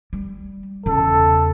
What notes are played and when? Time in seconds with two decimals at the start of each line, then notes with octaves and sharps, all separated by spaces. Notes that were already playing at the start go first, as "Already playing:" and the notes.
0.13 G3
0.86 E2 C#3 A4